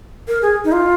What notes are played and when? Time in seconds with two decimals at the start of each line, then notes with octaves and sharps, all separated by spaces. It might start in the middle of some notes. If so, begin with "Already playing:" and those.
0.28 A#4
0.42 G#4
0.65 D#4
0.72 F4